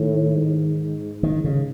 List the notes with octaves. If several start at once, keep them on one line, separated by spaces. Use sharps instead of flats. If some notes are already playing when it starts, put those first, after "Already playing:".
Already playing: A2 D#3
G#2
D#3
C#3